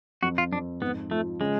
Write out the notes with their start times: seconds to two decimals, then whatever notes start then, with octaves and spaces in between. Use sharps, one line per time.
0.22 F2 F#4
0.38 F4
0.52 F2 D4
0.81 G#2 B3
1.11 F3 A3
1.41 C#3 G#3